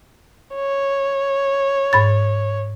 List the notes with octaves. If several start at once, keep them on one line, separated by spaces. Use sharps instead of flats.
C#5
G#2 B5 A6